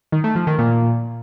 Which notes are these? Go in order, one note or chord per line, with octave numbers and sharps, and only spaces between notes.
D#3
A3
F3
D#3
A#2